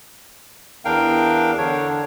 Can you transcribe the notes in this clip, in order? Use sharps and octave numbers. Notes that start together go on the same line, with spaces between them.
E2 D4 A#4 F5 G5
D3 D4 C#5